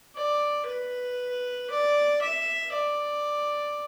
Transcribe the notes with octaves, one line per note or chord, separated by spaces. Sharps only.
D5
B4
D5
E5
D5